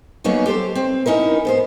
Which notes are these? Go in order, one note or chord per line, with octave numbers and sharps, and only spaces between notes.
F#3 A#3 B3 C#4 D#4 F#4
G4 A4 C5
C4
C#4 D#4 E4 A#4
G#2 B3 C5